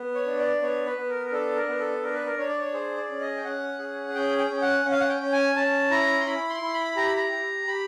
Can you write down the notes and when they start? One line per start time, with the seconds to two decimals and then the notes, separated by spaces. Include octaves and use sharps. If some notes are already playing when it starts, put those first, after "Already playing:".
Already playing: B3
0.15 C#5
0.26 D4
0.39 D5
0.62 B3 C#5
0.86 B4
0.97 B3
1.09 A#4
1.27 A#4
1.32 D4 A4
1.56 A#4
1.68 B3
1.79 A4
2.03 D4 A#4
2.14 B4
2.25 A#4
2.38 D4 C#5
2.49 D5
2.59 C#5
2.73 G#4 C5
2.97 D5
3.09 C#4
3.21 D#5
3.37 G5
3.44 C#4 F#5
3.79 G#4
4.15 C#4 G5
4.38 G5
4.50 C#4
4.62 F#5
4.85 C#4
4.91 F5
5.00 F#5
5.09 G5
5.21 C#4
5.32 G#5
5.55 C#4 A5
5.91 E4 A#5
6.21 C6
6.26 E4 B5
6.50 C6
6.62 E4
6.73 B5
6.96 G4 A#5
7.07 B5
7.16 A#5
7.32 G4
7.67 G4 B5